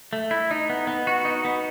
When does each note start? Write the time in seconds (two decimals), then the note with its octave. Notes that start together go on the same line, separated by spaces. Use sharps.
0.13 A3
0.31 E4
0.51 D#4
0.70 B3
0.87 B3
1.07 F#4
1.25 D#4
1.45 B3